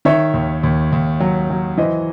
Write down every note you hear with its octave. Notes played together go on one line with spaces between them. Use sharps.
D#3 C#5 E5
D#2
D#2
D#2
F#3
F#3
E3 C5 D#5